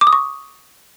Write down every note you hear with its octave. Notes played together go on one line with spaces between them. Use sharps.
D6
D#6
C#6